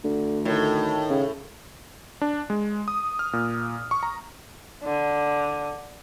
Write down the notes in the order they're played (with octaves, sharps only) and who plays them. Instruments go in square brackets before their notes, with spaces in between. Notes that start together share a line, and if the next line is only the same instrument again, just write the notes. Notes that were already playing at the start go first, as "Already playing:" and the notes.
[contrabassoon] D2 [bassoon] D3
[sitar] A2 [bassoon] D#3
[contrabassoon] C#3
[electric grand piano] D4
G#3
D#6
F6
A#2
C#6
A#5
[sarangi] D3